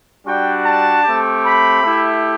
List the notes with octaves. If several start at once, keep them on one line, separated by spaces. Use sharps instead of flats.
G3 D4 F#4 G5
A5
A3 C4 G4
B5
A3 E4 G4